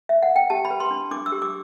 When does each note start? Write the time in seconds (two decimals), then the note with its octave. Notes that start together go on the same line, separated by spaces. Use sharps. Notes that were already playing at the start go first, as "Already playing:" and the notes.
0.09 E5
0.22 F#5
0.36 G5
0.50 G4 A5
0.65 B5
0.71 B4
0.80 C6
0.91 D4
1.11 D4 D6
1.26 E6
1.32 G4
1.42 D6